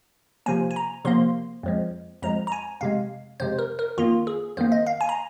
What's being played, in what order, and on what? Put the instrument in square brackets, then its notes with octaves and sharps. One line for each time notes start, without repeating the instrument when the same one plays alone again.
[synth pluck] C3 F3 A#3 G#5
G#5
A#5
C3 F3 A#3 C6
F2 F3 G#3
F2 F3 G#3 A#5
A#5
G#5
F2 C3 G#3 F5
F2 C3 G#3 C5
A#4
A#4
F2 D#3 A#3 F4
G#4
F2 D#3 A#3 C5
D#5
F5
G#5
A#5